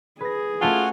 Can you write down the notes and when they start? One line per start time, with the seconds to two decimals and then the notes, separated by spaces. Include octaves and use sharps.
0.21 G#4 B4 A#6
0.61 A3 C#4 F4 F#4 F#5 G#5 A5